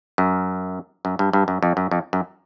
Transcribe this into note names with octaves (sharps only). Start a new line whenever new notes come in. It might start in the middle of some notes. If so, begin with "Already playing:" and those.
F#2
F#2
G2
G2
F#2
F2
F#2
F2
F#2